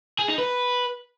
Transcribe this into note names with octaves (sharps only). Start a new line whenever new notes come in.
G#4
D#4
B4